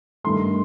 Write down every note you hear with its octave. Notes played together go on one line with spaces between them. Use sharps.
G2 D#3 A3 C6